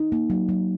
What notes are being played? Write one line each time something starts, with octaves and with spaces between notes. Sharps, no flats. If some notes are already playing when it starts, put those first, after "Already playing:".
Already playing: D#4
A#3
F#3
F#3